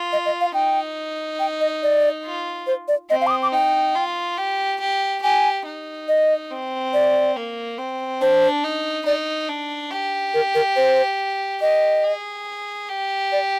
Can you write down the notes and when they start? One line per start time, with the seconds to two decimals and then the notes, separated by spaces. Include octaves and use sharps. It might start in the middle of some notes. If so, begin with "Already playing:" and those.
Already playing: F4
0.13 D#5
0.26 D#5
0.41 F5
0.54 D#4 G5
1.40 G5
1.61 D#5
1.83 D5
2.25 F4
2.67 C5
2.88 D5
3.10 C4 D#5
3.21 F5
3.27 D6
3.31 D#6
3.43 D6
3.52 D#4 G5
3.95 F4
4.38 G4
4.80 G4
5.22 G4 G#5
5.65 D#4
6.08 D#5
6.51 C4
6.93 D5
7.36 A#3
7.78 C4
8.21 D4 C5
8.64 D#4
9.06 D#4 D5
9.49 D4
9.91 G4
10.34 A#4
10.55 A#4
10.76 C5
11.61 G4 D#5
12.04 G#4
12.89 G4
13.32 D5